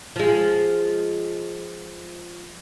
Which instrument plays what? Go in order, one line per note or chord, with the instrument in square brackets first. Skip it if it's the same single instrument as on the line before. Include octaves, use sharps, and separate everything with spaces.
[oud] F3 G#3